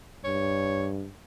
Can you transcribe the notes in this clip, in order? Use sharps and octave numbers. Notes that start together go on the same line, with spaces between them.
G2 C#5